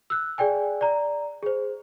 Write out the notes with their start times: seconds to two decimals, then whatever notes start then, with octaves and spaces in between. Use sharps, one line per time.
0.10 E6 F#6
0.38 G#4 D5 G5 G#5
0.81 D5 A#5
1.43 G#4 C5